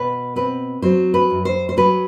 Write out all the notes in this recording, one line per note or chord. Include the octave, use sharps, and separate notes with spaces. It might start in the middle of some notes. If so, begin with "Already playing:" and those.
Already playing: B2 B4
C4 B4
F#3 C5
B4
F#2
C5
C5
F#3 B4